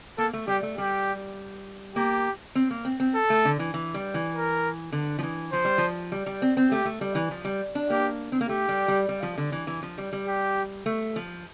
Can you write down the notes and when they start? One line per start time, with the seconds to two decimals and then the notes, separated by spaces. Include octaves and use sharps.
0.18 A#3 A4
0.33 A3
0.48 G3 G4
0.63 A3
0.77 G3 G4
1.96 A#3 G4
2.55 C4
2.71 A#3
2.85 C4
3.00 C4
3.15 A4
3.30 A3
3.45 D3
3.59 E3
3.74 E3
3.94 G3
4.14 E3
4.34 A#4
4.92 D3
5.19 F3
5.23 E3
5.52 F3 C5
5.65 G3
5.78 F3
6.12 G3
6.26 G3
6.42 C4
6.57 C4
6.71 A3 G4
6.85 A3
7.01 G3
7.15 E3
7.31 F3
7.45 G3
7.75 D4
7.90 A#3 G4
8.32 C4
8.41 A#3
8.49 A3 G4
8.69 G3
8.88 G3
9.09 G3
9.23 F3
9.38 D3
9.52 E3
9.67 E3
9.83 F3
9.98 G3
10.13 G3
10.27 G4
10.86 A3
11.16 F3